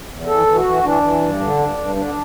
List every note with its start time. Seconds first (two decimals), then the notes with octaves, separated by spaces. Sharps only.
0.09 E2
0.27 E3 A4
0.46 E3
0.55 F#4
0.64 E3
0.83 E3 D4
1.03 E3
1.21 G2
1.40 D3
1.58 G2
1.77 G2
1.96 D3 D4